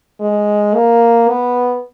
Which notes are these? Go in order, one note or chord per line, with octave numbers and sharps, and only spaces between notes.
G#3
A#3
B3